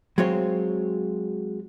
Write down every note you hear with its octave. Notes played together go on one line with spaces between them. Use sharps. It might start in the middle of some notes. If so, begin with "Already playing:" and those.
F#3 G#3 C4 F4 C#5